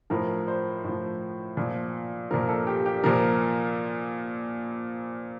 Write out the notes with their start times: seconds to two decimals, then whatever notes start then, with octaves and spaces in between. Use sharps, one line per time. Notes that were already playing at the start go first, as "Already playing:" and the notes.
0.10 A2 F3 A#4
0.48 C5
0.84 A2 F3
1.57 A#2 F3
2.31 A#2 F3 A#4
2.49 A4
2.67 G4
2.86 G4
3.03 A#2 F3 A#4